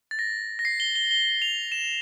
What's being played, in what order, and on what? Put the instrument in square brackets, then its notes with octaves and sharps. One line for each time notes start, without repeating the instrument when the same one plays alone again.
[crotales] A6
A#6
A#6
C7
G7
G7
G7
F7
E7